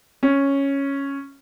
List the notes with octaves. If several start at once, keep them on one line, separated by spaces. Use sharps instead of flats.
C#4